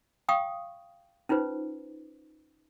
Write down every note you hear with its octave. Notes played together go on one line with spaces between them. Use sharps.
F5 G5 C#6 D#6
C#4 D#4 F4 B4 C5